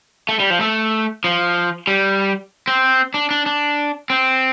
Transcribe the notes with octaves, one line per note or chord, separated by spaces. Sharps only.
A3
G3
F3
A3
F3
G3
C4
D4
D4
D4
C4